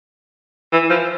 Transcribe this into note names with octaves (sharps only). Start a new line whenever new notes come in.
E3
F3